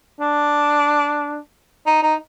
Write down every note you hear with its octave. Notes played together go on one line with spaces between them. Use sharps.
D4
D#4
D#4